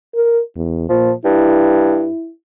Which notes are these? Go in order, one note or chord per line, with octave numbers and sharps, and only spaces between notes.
A#4
E2
A#2 F3
G2 E4